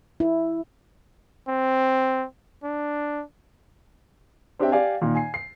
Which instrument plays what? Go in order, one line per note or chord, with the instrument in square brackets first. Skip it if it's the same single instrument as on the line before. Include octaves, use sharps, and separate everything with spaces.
[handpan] E4
[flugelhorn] C4
D4
[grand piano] C4 D4 G4 C#5 E5 G5
G4 D5 F5 G#5
A#2 D#3
G#5 C7
C7